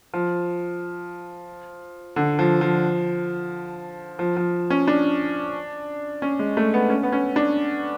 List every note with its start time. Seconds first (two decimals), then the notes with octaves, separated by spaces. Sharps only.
0.13 F3
2.16 D3
2.39 F3
2.61 F3
4.19 F3
4.37 F3
4.70 C#4
4.88 D4
6.22 C#4
6.39 G#3
6.57 A3
6.74 B3
6.90 C#4
7.03 B3
7.12 C#4
7.36 D4